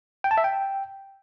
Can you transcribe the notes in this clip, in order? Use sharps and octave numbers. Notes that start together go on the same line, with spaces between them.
G5
A5
E5
G5